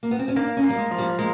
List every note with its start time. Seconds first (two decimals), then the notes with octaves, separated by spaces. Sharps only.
0.03 A#3
0.11 B3
0.19 C4
0.28 C#4
0.36 A#3 D4
0.57 C#4
0.63 A#3
0.69 G3
0.77 G#3
0.91 F3
0.99 G3
1.18 G#3 A#3